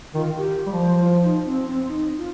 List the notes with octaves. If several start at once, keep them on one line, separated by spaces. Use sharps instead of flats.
D#3 F4
G4
G3
F3
C5
F4
D#4
C4
C4
D#4
F4